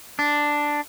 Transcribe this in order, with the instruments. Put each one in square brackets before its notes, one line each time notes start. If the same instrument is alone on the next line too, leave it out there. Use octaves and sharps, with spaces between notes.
[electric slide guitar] D4